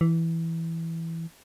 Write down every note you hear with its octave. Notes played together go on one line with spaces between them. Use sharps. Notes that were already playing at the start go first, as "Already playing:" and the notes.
E3